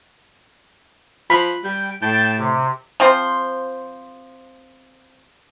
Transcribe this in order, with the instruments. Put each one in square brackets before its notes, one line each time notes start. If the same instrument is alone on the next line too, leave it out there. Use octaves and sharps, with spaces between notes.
[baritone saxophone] F3 [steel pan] B5
[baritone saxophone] G3 [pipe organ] G5
[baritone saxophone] A2 [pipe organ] G5 A5 G6
[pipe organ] C3
[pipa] F3 C4 C5